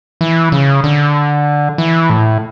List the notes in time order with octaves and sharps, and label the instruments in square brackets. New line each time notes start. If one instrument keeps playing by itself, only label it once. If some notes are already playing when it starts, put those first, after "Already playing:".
[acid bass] E3
C#3
D3
E3
A2